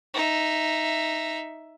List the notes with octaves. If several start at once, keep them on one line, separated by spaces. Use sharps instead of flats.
D#4 E5